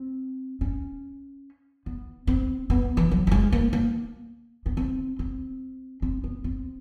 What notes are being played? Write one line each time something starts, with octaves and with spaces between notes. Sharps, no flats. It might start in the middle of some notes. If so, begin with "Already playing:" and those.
Already playing: C4
C#4
B3
C4
B3
E3
F#3
A3
G#3
A#3
A#3
B3
C4
C4
C4
B3
C4